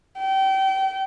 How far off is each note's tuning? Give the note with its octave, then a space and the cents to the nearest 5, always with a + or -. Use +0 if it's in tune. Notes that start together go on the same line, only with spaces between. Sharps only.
G5 -30